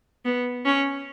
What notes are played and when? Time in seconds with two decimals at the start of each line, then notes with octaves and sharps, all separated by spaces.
0.25 B3
0.65 C#4